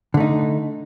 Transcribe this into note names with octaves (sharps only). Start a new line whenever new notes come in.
D3 A3 D#4